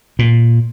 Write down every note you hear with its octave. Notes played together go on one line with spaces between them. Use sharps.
A#2